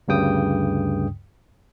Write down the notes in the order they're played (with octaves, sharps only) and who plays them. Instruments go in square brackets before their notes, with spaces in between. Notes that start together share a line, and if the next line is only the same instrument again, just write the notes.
[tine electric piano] D2 G2 C#3 G5 D#6